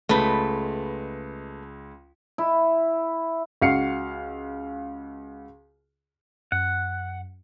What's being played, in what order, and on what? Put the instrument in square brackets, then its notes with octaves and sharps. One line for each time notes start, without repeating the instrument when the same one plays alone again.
[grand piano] C#2 G#3 [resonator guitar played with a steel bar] A3 B4
[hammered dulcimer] E4
[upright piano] C#2 F#4 F5 C7 C#7
[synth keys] F#2 [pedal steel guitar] F#5